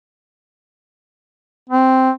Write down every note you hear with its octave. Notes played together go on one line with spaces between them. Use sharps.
C4